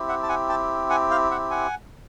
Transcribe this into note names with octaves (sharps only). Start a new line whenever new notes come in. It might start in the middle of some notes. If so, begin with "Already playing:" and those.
Already playing: C4 E4 G4
E5 F#5
A5
F#5 G#5
G5 A5
F#5 G#5
F5 G5
E5 F#5
F#5 G#5